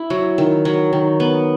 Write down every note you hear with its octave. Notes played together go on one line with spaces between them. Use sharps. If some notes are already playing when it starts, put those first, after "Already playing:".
Already playing: E4
F#3
D#3
F#3
D#3
B3